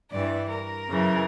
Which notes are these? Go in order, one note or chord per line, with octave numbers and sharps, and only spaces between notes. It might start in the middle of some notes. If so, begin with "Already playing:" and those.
G2 E3 D5
A#4
F#2 C#3 E3